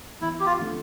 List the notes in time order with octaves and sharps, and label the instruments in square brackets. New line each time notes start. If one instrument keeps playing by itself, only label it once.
[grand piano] E2 [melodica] E4
[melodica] G4
F4
[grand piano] D3 F3 A3 C4